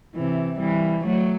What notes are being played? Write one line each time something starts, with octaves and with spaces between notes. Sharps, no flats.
C3 E3
E3 G3
F#3 A3